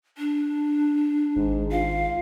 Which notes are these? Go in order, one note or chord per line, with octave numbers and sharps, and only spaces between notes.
D4
G#1 G#2
F4 F5